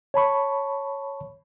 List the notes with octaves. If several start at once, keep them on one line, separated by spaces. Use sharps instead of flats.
C#5 A5 B5 C#6